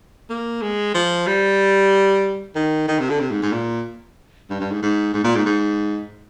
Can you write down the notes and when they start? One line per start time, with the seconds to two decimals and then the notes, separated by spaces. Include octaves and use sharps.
0.30 A#3
0.62 G#3
0.94 F3
1.27 G3
2.55 D#3
2.88 D#3
2.99 C3
3.10 D3
3.20 C3
3.31 G#2
3.42 G#2
3.52 A#2
4.50 G2
4.60 G2
4.72 G#2
4.82 G#2
5.14 G#2
5.24 A#2
5.35 G#2
5.46 G#2